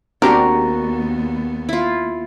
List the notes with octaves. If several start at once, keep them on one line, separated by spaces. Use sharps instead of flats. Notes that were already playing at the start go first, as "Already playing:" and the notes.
D#2 B3 C4 D4 F#4 G4 A#4
E4 F4